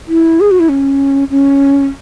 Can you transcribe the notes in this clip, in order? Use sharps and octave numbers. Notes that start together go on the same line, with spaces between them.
E4
G#4
F#4
E4
C#4
C#4